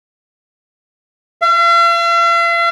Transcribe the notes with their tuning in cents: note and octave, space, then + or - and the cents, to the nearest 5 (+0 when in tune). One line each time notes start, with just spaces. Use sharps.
F5 -45